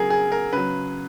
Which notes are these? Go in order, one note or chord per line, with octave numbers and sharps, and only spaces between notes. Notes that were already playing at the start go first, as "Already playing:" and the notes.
Already playing: C#3 F#3 G#4 A#4
G#4
A#4
C#3 F#3 B4